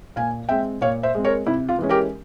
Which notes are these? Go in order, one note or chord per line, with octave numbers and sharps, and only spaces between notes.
A#2 F5 G#5
G#3 C4 E5 G5
A#2 C#5 F5
C5 E5
G#3 C4
A#4 C#5
C3 E4
F4
E3 G#3 C#4
G4 A#4